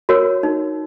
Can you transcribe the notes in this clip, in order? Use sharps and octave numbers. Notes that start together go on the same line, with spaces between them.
F#4 A#4 C#5
D#4